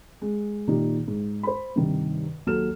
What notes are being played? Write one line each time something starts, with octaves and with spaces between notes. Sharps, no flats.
G#3
A#2 D#3 D#4 G4
G#2
C5 B5
G2 C3 D#3
D#2 F#3 A4 F6 E7